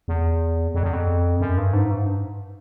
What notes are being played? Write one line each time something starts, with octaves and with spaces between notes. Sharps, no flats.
E2
F2
E2
F2
F#2
G2
G#2
G2